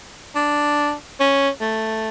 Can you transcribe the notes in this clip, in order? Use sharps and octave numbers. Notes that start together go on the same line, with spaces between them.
D4
C#4
A3